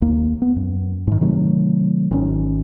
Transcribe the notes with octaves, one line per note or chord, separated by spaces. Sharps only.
D#2 A#3
B3
F#2
G#2 D#3
C3 D#3 F#3 A3
G#1 D#3 C#4